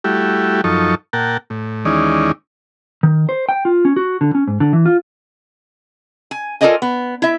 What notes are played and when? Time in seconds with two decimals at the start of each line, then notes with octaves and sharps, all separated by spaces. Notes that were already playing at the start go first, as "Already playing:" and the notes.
0.04 G3 A3 E4 F#4 G4
0.64 F#2 F3 D#4 A4 C#6
1.13 A#2 A#4 F#5 G5 A5
1.50 A2
1.85 D#2 E3 G#3 C#4 D#4 D5
3.03 D#3
3.29 C5
3.49 G5
3.65 F4
3.85 C#4
3.96 F#4
4.21 D3
4.35 C#4
4.48 G#2
4.60 D3
4.73 E3
4.86 F4
6.31 G#5
6.61 F4 A4 A#4 D5 D#5 G#5
6.82 B3
7.22 E4 E5